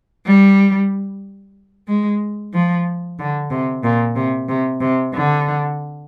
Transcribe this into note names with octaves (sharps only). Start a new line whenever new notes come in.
G3
G#3
F3
D3
C3
A#2
C3
C3
C3
D3